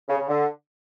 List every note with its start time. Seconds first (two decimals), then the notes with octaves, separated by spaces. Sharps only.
0.08 C#3
0.18 C#3
0.28 D3